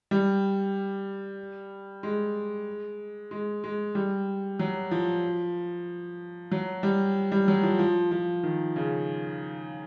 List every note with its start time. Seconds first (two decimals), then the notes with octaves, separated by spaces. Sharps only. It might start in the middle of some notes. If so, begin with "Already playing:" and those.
0.11 G3
2.03 G#3
3.31 G#3
3.64 G#3
3.95 G3
4.59 F#3
4.91 F3
6.51 F#3
6.83 G3
7.32 G3
7.48 F#3
7.63 F3
7.79 F3
8.11 F3
8.43 D#3
8.76 C#3